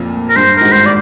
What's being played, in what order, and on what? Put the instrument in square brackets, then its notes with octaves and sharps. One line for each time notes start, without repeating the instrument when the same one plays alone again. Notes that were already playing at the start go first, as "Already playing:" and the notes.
Already playing: [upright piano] F2 A#2
[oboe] A#4
[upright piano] G2 [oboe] C5
[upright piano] G#1 G#2 [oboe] A#4
[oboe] C5
D5